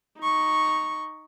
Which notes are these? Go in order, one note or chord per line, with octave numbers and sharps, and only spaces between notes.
D#4 C#6